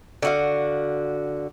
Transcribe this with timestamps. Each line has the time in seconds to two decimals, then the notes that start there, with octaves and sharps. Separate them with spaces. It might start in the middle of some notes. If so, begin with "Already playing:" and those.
0.22 D3 F#4 F5